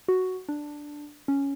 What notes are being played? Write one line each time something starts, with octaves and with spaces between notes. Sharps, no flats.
F#4
D4
C#4